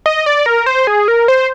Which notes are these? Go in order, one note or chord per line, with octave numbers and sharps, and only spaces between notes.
D#5
D5
A#4
C5
G#4
A#4
C5